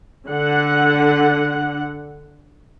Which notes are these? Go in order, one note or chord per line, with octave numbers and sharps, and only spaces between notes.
D3 F#5